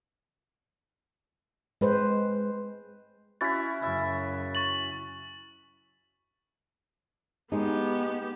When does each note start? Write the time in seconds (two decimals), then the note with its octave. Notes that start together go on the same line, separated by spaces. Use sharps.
1.81 G#3 B4 C5
3.41 C#4 E4 F#4 A6 B6
3.83 F#2 C#3 E5
4.55 C#6 A6 F#7
7.52 G#3 B3 D#4 G4